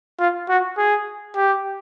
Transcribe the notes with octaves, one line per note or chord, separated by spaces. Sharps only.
F4
F#4
G#4
G4